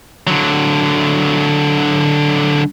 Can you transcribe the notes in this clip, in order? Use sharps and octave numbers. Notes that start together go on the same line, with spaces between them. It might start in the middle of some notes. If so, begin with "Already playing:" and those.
D3 F#3